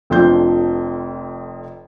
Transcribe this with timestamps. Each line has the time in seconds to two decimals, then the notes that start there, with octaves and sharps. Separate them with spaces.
0.10 F1 F2 F3 D4 C6 G6